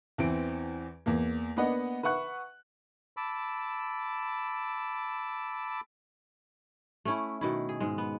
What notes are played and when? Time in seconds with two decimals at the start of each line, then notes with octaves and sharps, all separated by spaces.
0.18 E2 E3 C4 D7
1.06 E2 A#3
1.56 A#3 B3 D4 B4 D#5 F#5
2.03 B4 E5 F#5 C#6 F#6
3.17 A5 B5 D6 E6
7.05 A3 C#4 E4
7.41 B2 D#3 E4
7.69 G#4
7.80 G#2 G#3
7.98 B3